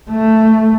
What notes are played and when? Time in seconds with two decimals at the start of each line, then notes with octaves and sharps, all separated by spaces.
0.11 A3